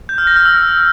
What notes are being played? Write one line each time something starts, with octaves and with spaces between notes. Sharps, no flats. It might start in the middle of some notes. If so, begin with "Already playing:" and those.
G6
F6
A#6
F6
E6